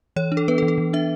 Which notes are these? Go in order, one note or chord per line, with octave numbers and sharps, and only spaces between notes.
E3 C#5
D4
A4
B3 B4
A4
E3
A4
E3
D4 E5